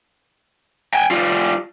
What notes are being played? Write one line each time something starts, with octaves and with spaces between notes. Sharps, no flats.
G5 G#5
G3 F4